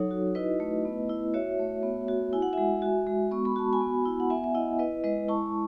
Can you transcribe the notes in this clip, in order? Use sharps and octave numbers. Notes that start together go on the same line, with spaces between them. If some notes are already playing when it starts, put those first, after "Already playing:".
Already playing: F#3 D#4 A4 C#5
F#4
E4 B4 D#5
A3
B3
E4
F#4 C#5 E5
A3
B3
F#4
E4 G#5
F#5
G#3 E5 G#5
F#4
G#3
B3 C#6
B5
F#4 A5
G#5 B5
B3
E4
F#5
B3 E5 G#5
E5
E4 D#5 F#5
E4 B4 D#5
G#3 B4 D#5
E4 A5 C#6